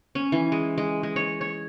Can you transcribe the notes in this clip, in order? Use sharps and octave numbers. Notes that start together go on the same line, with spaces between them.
C#4
E3
G#3
G#3
G#3
C#5
C#5